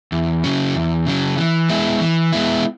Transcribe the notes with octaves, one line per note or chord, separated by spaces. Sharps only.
E2
C#3 F#3 C#4
E2
C#3 F#3 C#4
E3
G#3 B3 E4
E3
G#3 B3 E4